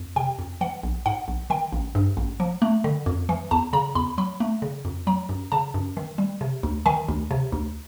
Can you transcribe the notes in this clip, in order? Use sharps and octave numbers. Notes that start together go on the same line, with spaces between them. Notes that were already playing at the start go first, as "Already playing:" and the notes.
Already playing: F2
C3 G5
F2
E3 F#5
A#1
G#2 F#5
A#1
D#3 G5
A1
G2
A1
F3
A3
D3
F2
E3
E2 A5
C#3 A#5
E2 B5
F#3 B5
A3
C#3
F2
F#3 A#5
F#2
C#3 A5
F#2
D#3
G3
C3
D2
D#3 G#5
D2
C3
D2